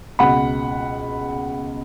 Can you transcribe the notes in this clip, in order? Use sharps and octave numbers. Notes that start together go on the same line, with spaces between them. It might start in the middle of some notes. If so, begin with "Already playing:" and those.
C#2 B2 F#5 B5